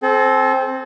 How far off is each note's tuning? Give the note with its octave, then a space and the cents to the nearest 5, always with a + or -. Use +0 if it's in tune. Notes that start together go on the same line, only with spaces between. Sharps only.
C4 +0 A4 -40